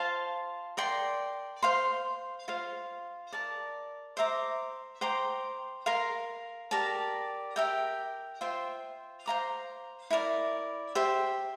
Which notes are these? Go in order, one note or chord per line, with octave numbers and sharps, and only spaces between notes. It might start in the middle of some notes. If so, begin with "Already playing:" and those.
Already playing: F4 C5 F5 A5
A#4 D5 G5 C6
C5 F5 C6
F4 C5 F5
A#4 D5 A5
C5 E5 A#5 D6
C5 G5 A#5 D6
A#4 F5 C6
G4 A#4 D5 A5
G4 A#4 E5 G5
F4 C5 E5 G5
C5 F5 A#5 D6
E4 A#4 D5
G4 C5 E5 G5